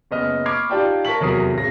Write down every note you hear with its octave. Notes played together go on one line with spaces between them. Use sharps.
F#1 B3 D#5 F6
B5 C#6 D6 F6 G#6 C7
D#4 F4 G4 D5 G5 A5
A#4 A5 C#6 B6 F#7
F1 E2 F#3 A#4 D#6 C7
D1 C#3 A#6